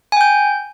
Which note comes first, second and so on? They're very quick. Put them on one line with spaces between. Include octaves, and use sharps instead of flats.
G#5 G5 G6